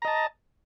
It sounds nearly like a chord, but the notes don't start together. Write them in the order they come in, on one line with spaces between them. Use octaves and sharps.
A#5 D#5 A5